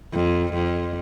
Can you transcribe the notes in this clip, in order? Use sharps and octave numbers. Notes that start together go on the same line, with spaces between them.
F2
F2